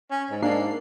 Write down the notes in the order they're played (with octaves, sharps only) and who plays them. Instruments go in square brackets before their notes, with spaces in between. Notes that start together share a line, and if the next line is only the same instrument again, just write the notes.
[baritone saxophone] C#4
G#2
[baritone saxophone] G#2 [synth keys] A#3 D4 C7